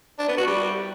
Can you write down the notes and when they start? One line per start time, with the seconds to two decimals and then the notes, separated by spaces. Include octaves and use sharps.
0.19 D4
0.28 B3
0.38 F#4
0.47 G3